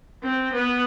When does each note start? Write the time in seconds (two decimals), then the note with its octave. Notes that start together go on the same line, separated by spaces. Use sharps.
0.23 C4
0.53 B3